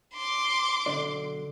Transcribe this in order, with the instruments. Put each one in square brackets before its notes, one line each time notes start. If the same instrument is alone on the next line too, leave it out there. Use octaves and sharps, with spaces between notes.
[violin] C6 D6
[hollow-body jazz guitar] B1 D3 D5